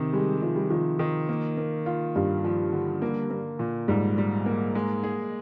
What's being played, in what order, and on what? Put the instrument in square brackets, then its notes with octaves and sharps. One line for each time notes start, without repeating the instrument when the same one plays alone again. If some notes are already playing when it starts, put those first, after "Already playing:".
Already playing: [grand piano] C3 D#3
[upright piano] G3 [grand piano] G#3
[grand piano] C3 [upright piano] F3
[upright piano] G3
[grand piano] D#3 [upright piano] F3
[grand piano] D#3
A#3
A#3
F4
[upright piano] G2 [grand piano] F4
[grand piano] F3
D3
A#3
A#3
A#2
[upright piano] G#2 [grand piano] G3
[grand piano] G3
A#3
G#3
G#4